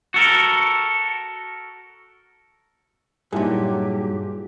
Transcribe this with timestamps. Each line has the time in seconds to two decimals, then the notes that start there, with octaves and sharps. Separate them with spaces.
0.14 F#4 A4 A#4
3.32 G2 A#2 F#3 D#4 E4 G4 G#4